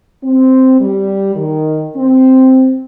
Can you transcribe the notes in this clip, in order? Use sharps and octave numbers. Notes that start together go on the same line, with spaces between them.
C4
G3
D#3
C4